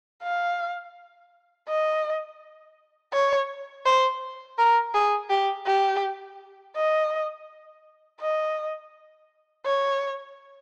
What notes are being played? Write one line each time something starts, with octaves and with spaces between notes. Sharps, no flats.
F5
D#5
C#5
C5
A#4
G#4
G4
G4
D#5
D#5
C#5